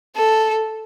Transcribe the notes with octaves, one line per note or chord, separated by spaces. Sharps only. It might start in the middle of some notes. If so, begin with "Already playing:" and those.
A4